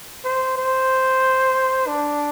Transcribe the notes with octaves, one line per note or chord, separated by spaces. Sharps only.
C5
C5
D4